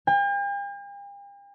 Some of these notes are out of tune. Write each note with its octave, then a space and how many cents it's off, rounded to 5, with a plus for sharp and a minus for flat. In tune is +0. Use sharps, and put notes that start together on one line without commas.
G5 +45